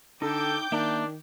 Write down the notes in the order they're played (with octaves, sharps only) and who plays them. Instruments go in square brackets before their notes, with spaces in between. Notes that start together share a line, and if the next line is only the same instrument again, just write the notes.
[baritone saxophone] D3 [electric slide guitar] D#4 [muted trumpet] A4 [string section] G5 D6 G6
[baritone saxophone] D#3 [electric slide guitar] A#3 E5 [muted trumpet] D4